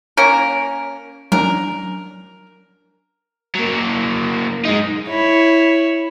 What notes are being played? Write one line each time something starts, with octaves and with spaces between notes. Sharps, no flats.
A#3 C#4 A#4
F#3 C#4 D4 A#4
F#3 A#3
G#3 D#4
E4 C#5